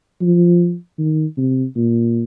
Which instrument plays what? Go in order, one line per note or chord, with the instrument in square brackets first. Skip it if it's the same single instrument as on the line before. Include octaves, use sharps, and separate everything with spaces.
[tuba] F3
D#3
C3
A#2